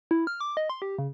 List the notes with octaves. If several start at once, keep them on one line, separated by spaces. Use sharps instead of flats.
E4
F6
D6
D#5
C6
G4
C#3